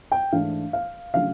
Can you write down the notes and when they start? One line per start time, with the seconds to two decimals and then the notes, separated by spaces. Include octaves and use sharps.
0.12 G5
0.32 G#2 E3 A3 D4 F5
0.73 F5
1.14 C#3 F#3 A3 D4 F5